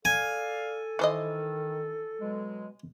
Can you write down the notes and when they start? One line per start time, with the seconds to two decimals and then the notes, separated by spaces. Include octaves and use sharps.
0.05 A4 D5 F5 G#5
0.99 D#3 E3 C5 D#5
2.19 B2 F#3 G#3